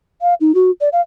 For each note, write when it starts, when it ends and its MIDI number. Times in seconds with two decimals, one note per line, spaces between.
0.22 0.34 77
0.41 0.54 63
0.55 0.71 66
0.81 0.89 74
0.92 1.01 77